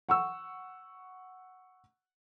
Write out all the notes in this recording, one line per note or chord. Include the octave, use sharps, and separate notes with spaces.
F#5 C#6 E6